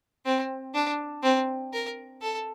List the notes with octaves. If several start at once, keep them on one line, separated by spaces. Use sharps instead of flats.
C4
D4
C4
A#4
A4